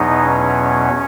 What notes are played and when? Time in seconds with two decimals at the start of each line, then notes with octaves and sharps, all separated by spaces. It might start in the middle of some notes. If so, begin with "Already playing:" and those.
Already playing: E2 B2 F#3 B3 D#4
0.23 C#4